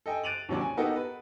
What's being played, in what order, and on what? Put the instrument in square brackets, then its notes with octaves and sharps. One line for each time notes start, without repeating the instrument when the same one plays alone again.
[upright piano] A4 D#5 G5 G#5
F#6 A6 D7 D#7 F7 F#7
D#2 C3 F#3 C#4 D4
G#5
B3 D#4 F#4 G4 A4 A#4
B4